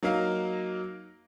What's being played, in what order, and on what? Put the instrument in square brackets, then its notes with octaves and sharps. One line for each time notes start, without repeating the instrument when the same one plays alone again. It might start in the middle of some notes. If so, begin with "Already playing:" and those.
[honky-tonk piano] F#3 A#3 D#4 A#4 F5